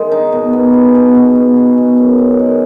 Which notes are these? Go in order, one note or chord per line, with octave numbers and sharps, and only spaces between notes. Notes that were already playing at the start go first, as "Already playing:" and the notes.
Already playing: D#3 G#3
D#4
B2
B3
G#4
B2
B2
B3
G#4
B2
F#2
D#3
G#3